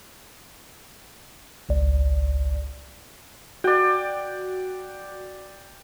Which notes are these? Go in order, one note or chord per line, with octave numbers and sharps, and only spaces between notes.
G#1 C#2 D5
F#4 D5 G5